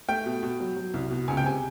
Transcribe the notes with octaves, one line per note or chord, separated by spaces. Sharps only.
A3 G5
B2
B2
F#3
F#3
C2
B2
C#2 G#5
G5
C3 G#5